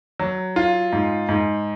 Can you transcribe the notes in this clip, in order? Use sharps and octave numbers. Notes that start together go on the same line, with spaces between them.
F#3
F4
G#2
G#2